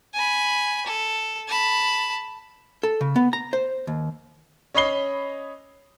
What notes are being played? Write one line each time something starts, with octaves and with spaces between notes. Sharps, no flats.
G#5 B5
A4
A5 B5
A4
C#3
B3
A#5
C5
D#2
C#4 C#5 D#5 B5 C7 G7